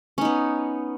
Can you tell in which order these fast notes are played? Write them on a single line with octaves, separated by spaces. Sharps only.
C#4 D#4 B3